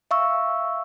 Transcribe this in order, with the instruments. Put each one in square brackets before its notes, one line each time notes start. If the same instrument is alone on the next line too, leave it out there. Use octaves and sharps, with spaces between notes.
[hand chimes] E5 F5 C#6 E6